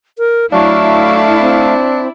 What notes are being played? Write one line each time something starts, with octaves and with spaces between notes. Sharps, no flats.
A#4
F#3 A3 D4 E4 F5
C4